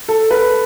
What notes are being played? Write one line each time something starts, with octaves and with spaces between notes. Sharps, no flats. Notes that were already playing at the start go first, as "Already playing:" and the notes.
A4
B4